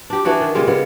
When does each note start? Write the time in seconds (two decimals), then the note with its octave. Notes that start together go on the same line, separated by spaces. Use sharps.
0.10 D4 G4
0.25 E3 D4 F#4 D#5
0.41 D#3
0.55 A#2 C#3 G3 G#3
0.67 C#3 B3